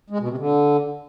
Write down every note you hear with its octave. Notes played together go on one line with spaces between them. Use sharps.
G#3
B2
C3
D3